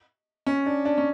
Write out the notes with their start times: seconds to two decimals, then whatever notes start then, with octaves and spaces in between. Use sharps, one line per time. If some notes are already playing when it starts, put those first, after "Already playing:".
0.47 C#4
0.66 D4
0.85 D4
0.98 C#4